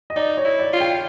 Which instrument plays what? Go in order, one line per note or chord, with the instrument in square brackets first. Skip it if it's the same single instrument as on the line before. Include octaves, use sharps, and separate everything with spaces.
[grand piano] D#5
[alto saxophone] D#4 [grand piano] D5
[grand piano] C#5
[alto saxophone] E4
[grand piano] D5
[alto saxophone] F4
[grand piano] G5